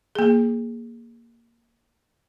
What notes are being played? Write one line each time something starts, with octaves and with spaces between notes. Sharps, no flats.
A#3 G#4